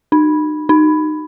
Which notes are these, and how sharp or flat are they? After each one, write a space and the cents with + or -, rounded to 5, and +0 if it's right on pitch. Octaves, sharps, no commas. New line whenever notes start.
D#4 -40
D#4 -20